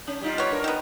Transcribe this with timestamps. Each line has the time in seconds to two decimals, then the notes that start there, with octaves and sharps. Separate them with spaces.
0.07 C#4
0.21 G3 D#4 F4
0.38 B3 C#5
0.51 D4 A#4
0.64 D#3 B3